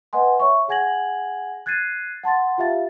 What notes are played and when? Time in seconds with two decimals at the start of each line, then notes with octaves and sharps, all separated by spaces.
0.13 B4 D#5 F#5 G#5 C6
0.40 C#5 E5 C#6
0.68 G#4 F#5 G#5 G#6 A#6 F#7
1.66 F#6 G#6 A6 C7 D#7
2.24 F#5 A5 C6 A6
2.58 F4 G4 E5 F5 A6